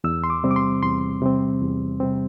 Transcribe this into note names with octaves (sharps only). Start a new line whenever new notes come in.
E2 E6
C6
D6
C3 G3 C4
D6
C6
E2 C6
C3 G3 C4
E2
C3 G3 C4